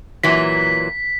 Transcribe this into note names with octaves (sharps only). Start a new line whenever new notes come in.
A#2 E3 F#3 B6